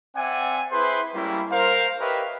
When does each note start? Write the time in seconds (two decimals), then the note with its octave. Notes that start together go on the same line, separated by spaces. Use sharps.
0.16 C4 D5 E5 F#5 G#5
0.71 E4 G#4 B4 C5 C6
1.14 G3 G#3 A#3 C#4 E4
1.52 A#4 C5 F5
2.00 G4 A#4 B4 C#5 D#5 E5